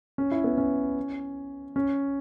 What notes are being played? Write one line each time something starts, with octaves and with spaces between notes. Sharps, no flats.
C#4
E4
B3
C#4
C#4